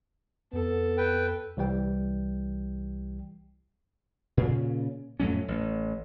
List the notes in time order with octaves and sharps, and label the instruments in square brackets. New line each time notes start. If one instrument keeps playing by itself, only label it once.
[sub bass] F2 [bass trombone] B3 [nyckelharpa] A4
[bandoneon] B4 G5
[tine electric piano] C2 E3 G3 G5
[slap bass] A#2 C#3 C#4
F2 A2 F#3 C#4
A1